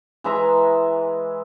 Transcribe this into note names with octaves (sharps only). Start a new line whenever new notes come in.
E3 G#3 E5 A#5